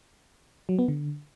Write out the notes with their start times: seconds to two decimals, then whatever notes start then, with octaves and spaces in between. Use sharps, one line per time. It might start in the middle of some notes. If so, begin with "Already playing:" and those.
0.69 F#3
0.79 B3
0.88 D3